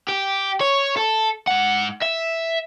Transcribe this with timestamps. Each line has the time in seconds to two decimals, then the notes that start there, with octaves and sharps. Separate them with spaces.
0.08 G4
0.61 C#5
0.97 A4
1.47 G#2 F#5
2.02 E5